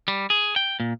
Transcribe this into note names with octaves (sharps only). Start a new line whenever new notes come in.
G3
G#4
G5
A#2